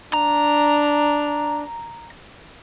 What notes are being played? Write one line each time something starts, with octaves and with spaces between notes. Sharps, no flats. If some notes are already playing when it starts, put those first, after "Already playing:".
D4 A#5